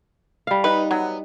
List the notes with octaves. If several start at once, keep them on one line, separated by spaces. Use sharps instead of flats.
G3 F5
D#4 B4
F#3 B3